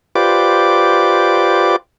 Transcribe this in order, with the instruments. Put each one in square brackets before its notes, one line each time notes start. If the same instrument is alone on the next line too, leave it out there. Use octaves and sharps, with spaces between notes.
[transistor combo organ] F4 G4 B4 C5 D5 D6